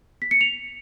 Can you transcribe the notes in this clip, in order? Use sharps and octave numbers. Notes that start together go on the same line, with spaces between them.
B6
C#7
F7